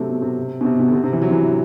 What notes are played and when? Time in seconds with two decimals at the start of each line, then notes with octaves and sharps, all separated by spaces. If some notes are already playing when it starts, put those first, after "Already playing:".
Already playing: C3 F#3 A3
0.09 B2
0.22 C3
0.61 B2
0.65 C3
0.80 B2
0.88 D3
0.94 C3
1.04 C3
1.13 E3
1.22 F#3
1.31 C3 E3